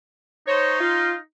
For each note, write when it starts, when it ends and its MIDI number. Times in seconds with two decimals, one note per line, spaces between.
0.47 1.18 63
0.47 0.75 72
0.47 0.75 73
0.80 1.12 65